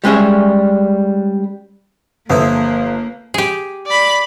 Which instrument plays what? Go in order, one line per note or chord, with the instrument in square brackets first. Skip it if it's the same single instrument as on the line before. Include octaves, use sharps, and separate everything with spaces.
[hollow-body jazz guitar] G3 G#3 C#4 G#4 E5
[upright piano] G1 [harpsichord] F3 E4 [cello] A#3 [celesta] A4 B4 D#6
[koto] G4 G#4
[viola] D5 B5